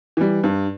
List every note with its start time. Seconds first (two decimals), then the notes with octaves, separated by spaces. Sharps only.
0.17 E3 G3
0.43 G2